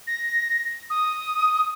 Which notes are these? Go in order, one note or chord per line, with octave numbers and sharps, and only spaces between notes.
A#6
D#6